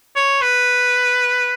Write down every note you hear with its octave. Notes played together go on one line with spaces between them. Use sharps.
C#5
B4